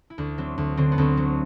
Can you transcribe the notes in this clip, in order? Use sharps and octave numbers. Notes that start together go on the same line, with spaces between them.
E4
D2 D4
F#3 C4
D2
D3 C4
B3
D2 C4
F#3